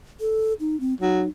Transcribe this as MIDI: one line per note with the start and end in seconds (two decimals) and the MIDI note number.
0.20 0.53 69
0.60 0.78 63
0.80 0.94 60
1.01 1.23 54
1.01 1.29 63